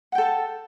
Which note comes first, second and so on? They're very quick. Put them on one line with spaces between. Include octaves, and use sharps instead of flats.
F#5 G5 A4 A5